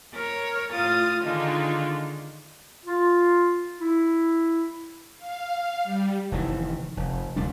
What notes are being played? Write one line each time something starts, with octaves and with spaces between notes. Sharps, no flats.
A#4 C#5
A2 F4 D#6 F6 A6
D3 D#3 G#3 D4 D#4 F4
F4
E4
F5
G3
F1 D#3 E3
F1
F1 D2 G3 D4